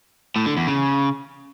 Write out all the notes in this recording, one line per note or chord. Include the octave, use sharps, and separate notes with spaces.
A2
D3
E2
C#3